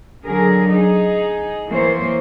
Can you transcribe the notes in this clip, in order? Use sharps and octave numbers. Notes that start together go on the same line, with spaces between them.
D3 F#3 G#4 A#4
D#4 G#4
E3 A#3 C5 C#5